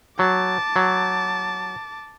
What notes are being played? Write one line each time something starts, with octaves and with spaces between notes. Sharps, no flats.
F#3 A5 D6
F#3